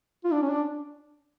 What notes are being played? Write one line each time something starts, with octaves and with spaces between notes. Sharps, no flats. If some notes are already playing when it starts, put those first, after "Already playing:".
F4
D4
C#4
D4